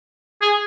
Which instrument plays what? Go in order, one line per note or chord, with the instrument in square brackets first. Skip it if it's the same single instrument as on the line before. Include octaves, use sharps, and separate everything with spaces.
[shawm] G#4